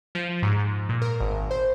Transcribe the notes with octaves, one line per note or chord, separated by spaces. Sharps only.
F3
G#2
A#2
A#4
G#1
C5